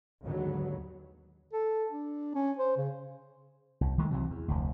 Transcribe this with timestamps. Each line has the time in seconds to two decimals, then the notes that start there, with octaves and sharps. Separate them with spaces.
0.23 D#2 G#2 D3 F#3 B3
1.53 A4
1.91 D4
2.35 C#4
2.58 C5
2.77 C#3
3.81 C2
3.98 D#3 G#3 A3
4.11 C2 C3 E3 F#3
4.30 E2
4.48 F1 D2